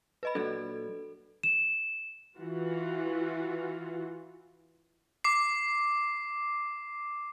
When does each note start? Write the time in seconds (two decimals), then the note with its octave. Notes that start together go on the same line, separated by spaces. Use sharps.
0.23 B4 D#5 B5
0.35 A#2 F#3 D4 A4
1.43 E7
2.38 E3 F4 F#4
5.24 D6 C7